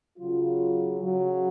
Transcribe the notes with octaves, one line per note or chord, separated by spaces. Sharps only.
C#3 F#3 F4
C#3 F#3 F#4